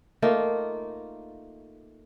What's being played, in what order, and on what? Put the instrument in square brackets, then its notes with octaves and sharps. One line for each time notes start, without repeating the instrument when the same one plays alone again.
[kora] A3 A#3 D#4 F4